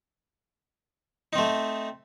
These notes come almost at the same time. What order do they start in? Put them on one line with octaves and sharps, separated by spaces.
D#4 C4 A3